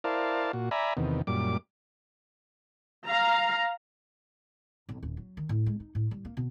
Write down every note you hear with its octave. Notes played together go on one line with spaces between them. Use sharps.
E4 A#4 C5 D5 F5 A5
A#2 F#4
D5 E5 G#5 A#5 B5
E2 C3 D#3 B3
F#2 A#2 G3 D6
F5 A#5
B1
D#1
F#3
D#3
A2
G#3
D#4
A2
G3
A#3
B2